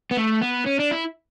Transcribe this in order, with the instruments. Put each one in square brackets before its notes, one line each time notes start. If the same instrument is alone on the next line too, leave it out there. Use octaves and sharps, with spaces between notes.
[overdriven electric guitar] B3
A3
B3
C#4
D4
E4